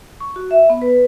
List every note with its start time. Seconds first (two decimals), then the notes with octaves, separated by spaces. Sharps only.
0.20 C#6
0.36 F#4
0.51 E5
0.70 B3
0.82 B4